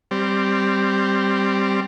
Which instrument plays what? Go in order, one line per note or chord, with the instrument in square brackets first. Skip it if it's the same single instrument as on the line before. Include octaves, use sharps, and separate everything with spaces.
[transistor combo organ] G3 C4